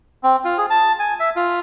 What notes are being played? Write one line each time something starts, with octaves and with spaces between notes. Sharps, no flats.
C4
F4
G#4
A5
G#5
E5
F4